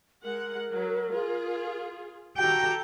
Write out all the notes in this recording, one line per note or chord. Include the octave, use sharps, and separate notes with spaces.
G#3 A#4 F#5
F#3
F4 G#4
F#4 G4 A4 G5 A#5